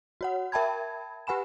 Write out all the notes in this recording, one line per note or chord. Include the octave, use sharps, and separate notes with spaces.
F#4 C#5 F#5
A#4 E5 G5 A5 B5 G#6
G4 B4 F#5 G#5 B5 E7